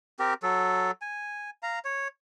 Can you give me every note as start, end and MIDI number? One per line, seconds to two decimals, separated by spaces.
0.19 0.34 60
0.19 0.34 67
0.19 0.34 70
0.43 0.91 54
0.43 0.91 69
1.02 1.50 80
1.63 1.79 77
1.63 1.79 82
1.85 2.08 73